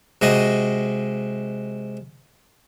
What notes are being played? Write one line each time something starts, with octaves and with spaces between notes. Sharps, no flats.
C3 G#3 F#4 D#5